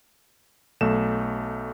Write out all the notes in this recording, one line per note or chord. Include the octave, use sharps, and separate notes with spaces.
B1 A3 E7